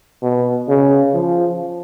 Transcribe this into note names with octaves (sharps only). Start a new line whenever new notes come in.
B2
C#3
F3